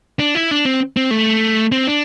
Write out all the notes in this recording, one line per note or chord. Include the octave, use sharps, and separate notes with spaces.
D4
E4
D4
C4
C4
A3
C4
D4